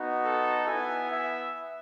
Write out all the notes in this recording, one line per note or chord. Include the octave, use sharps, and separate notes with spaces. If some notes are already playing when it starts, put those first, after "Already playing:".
Already playing: B3 D#4 F#4
A4
B3 E4 G#5
E5